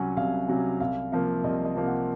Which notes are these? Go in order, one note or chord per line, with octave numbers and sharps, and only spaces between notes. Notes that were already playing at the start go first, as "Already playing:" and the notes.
Already playing: C2 C3 F#3 C#4 F#5 G#5
C2 F5
C3 F#3 C#4
C2 F5
C3 F3 A#3 F5
C2 D#5
D#5
C3 F3 A#3
F#5